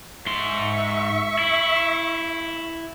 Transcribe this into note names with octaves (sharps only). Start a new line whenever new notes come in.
G#2 E5 C6 C#6
E4